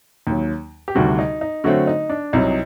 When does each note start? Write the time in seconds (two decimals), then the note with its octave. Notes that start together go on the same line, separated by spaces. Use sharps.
0.27 D#2 D#3 F#3
0.88 G4
0.95 D2 C3 D#3 G3 D4 F#4
1.19 D#4
1.41 D#4
1.64 D3 F#3 A3 C4 F#4
1.87 D#4
2.10 D4
2.33 C2 C3 F#3 D#4